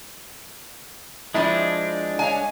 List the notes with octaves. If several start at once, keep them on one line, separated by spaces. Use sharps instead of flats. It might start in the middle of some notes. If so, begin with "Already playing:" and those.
F3 G#3 C4 D4 E4
C#5 F5 G#5